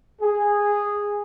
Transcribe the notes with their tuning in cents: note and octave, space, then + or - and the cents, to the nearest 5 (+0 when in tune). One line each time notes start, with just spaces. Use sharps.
G#4 -10